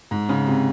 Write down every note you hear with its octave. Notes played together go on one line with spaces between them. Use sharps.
G#2
C#3
C3